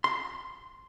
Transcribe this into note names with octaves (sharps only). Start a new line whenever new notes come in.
C6